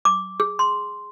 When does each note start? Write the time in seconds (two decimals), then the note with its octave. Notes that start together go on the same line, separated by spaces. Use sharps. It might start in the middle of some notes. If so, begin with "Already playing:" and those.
0.05 D6
0.40 G#4
0.59 C6